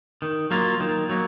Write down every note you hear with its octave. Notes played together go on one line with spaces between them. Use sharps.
D#3
F#3 A#3 F4
D#3
F#3 A#3